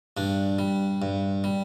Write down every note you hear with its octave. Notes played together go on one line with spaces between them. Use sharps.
G2 D4
G3
G2
G3